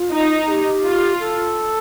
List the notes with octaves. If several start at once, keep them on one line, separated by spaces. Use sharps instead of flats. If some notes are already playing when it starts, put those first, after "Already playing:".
Already playing: F4
D#4
G#4
G4
F4
A4